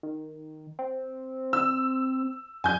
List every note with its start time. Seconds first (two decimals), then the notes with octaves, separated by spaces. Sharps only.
0.03 D#3
0.79 C4
1.53 E6
2.64 F#2 G#5 G6